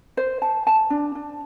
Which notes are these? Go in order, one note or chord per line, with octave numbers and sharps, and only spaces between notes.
C5
A5
A5
D4
D4